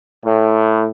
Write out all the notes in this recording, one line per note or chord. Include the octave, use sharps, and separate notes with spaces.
A2